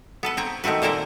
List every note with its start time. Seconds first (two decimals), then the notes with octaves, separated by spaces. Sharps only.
0.23 B3 A4 B4
0.37 C4 C#5 A#5
0.64 D#3 A3 C4 F#4 B4
0.82 A#2 A#3 A4 A#4 C5 A#5